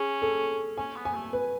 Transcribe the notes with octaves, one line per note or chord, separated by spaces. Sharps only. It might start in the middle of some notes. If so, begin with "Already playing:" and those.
Already playing: C#4 G#4
A4
C#4 G#5
B3
G#5
A3
B4